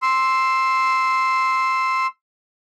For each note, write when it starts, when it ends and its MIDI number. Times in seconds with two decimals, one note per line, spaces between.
0.02 2.07 84
0.02 2.07 88